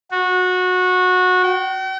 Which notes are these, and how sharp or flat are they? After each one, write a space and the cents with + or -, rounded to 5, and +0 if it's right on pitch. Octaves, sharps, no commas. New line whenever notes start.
F#4 -20
G5 -45